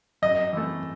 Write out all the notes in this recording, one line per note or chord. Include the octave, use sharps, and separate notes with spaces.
F#2 D#5
E3 A3